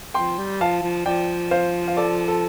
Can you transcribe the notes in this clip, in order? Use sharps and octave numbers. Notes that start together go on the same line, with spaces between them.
F3 G5 C6
G3
F3 F5 A5
F3
F3 D5 G5
C5 F5
F5
A4 D5
A4